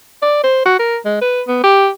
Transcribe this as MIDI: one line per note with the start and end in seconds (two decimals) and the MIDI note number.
0.22 0.41 74
0.44 0.62 72
0.65 0.78 66
0.80 0.97 70
1.05 1.18 56
1.21 1.42 71
1.47 1.61 59
1.64 1.88 67